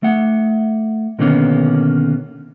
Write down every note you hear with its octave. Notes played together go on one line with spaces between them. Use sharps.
A3 F#5
B2 D3 D#3 A#3 B3 C#4